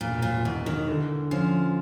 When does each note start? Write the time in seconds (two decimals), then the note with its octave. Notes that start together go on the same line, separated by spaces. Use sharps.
0.01 E1 A#2
0.22 A#2
0.45 B2 E3
0.66 D#3
0.88 D3
1.31 F3 C#4